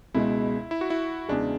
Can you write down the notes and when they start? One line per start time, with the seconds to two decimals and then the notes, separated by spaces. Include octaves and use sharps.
0.14 C#2 B2 G#3 E4
0.71 E4
0.81 F#4
0.90 E4
1.28 E2 C#3 G#3 D4